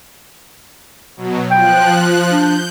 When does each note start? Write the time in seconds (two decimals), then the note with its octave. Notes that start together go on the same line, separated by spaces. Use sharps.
1.17 B2 F#3
1.51 F3 G5 F#6
2.32 D4 G6